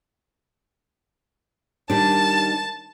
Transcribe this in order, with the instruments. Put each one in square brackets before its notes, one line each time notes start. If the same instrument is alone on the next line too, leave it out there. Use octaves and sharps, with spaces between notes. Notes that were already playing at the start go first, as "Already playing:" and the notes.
[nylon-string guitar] D#3 G3 D4 [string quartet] A5